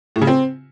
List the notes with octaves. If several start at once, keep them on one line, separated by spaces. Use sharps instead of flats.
A2
C#3
C4